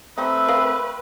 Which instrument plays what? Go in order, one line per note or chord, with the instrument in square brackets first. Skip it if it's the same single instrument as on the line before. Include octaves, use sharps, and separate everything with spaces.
[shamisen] G3 D#4 [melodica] A3 C4 [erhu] B4 [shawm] E5
[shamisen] A#4 D#5 F5